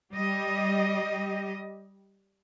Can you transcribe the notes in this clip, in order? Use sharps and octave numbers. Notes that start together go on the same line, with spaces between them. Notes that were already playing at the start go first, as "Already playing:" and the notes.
G3 G4 D#5